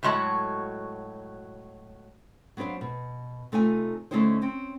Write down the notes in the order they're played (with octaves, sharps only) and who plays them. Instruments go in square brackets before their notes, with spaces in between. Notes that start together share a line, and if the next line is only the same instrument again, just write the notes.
[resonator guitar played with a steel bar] A2 F#3 G#3 F#4 A5
[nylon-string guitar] F#3 B3 D4 C5 F5
B2
C3 A3 D#4 F4 G#5
D3 A3 C#4 D#4 E4 C5
C4 C#4